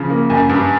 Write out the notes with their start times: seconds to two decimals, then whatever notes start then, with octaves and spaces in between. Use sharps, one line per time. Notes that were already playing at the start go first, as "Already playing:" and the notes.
Already playing: C#3 F3
0.10 A#3
0.30 F#2
0.49 G2